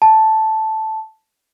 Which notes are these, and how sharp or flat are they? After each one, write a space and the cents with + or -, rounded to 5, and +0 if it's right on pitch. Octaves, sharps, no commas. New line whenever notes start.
A5 -5